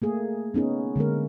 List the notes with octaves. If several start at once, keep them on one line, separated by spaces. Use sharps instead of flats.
A3 A#3 G#4
B3 C#4 D#4 G#4
D3 G#3 A#3 A#4